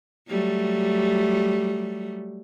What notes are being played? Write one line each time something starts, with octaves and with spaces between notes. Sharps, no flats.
F#3 G3 A3